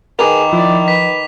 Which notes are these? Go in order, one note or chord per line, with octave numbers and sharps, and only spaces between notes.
D#3 G#4 A#4 B4 D6 F7
F3 E4 D5
B4 B6